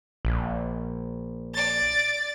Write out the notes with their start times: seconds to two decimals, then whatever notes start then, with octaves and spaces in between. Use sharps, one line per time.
0.25 A#1
1.54 D5 A6